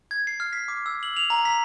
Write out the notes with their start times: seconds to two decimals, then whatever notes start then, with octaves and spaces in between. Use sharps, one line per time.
0.11 G#6
0.27 C7
0.40 F6
0.53 B6
0.68 D6
0.86 E6
1.03 F#7
1.17 F7
1.30 A#5
1.45 B6